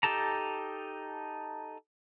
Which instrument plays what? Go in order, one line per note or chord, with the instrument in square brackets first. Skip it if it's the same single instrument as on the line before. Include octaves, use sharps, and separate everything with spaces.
[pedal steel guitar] D#4 G4 A4 A5 A#5